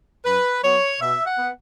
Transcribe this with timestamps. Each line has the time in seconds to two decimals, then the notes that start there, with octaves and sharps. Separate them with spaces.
0.25 F#2 B4
0.63 F#3 B3 C#5
1.01 B2 E5
1.26 F#5
1.38 B3